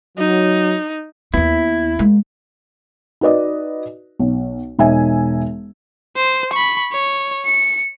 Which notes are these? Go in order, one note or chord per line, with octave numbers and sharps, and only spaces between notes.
F#3 D#4
D#2 B3 E4
G#3 A#3
D#4 F#4 B4 D5 D#5
B1
E1 D#4 E5 G#5
C5
B5 C#6
C#5
C#7